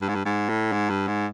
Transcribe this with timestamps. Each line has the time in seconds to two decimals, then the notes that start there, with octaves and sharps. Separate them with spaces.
0.02 G2
0.09 G#2
0.15 G2
0.25 G#2
0.49 A2
0.72 G#2
0.90 G2
1.08 G#2